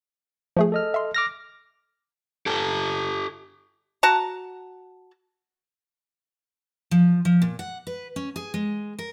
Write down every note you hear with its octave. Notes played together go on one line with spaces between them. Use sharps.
F3 A3 G#4
A4 D#5 F6
E5 C6
D6 F6 A#6
G4 A4
F#4 A5 A#5
F3
F3
A#2
F#5
B4
C#4
G#4
G#3
A#4